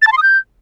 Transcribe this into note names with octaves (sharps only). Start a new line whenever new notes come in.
A6
A5
C6
D#6
G6